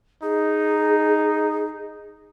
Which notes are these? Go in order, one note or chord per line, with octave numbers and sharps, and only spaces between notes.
D#4 G#4